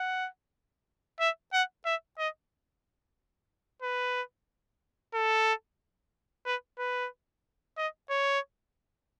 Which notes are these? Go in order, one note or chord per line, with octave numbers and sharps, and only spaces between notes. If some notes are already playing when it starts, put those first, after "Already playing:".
Already playing: F#5
E5
F#5
E5
D#5
B4
A4
B4
B4
D#5
C#5